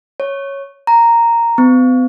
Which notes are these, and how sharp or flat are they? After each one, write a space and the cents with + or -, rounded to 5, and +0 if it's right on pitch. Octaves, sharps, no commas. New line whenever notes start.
C#5 -5
A#5 -5
B3 +45